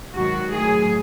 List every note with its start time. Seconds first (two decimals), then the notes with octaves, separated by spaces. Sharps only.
0.15 G#2 D#3 F#3 F#4
0.52 A2 F#3 G#4